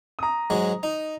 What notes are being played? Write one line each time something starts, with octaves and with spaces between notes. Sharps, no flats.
A#5 D#6
G#2 F#3 G#3
D#4